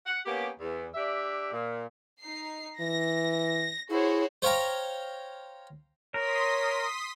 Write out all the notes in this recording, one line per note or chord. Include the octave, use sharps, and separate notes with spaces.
F#5
A#3 B3 C#4 G4
E2
D4 G4 D5 E5
A#2
D#4 C7
E3 A#6
E4 F#4 G#4 C5 C#5
C5 C#5 F5 G5 A#5
A#4 C#5 C6 D#6 B6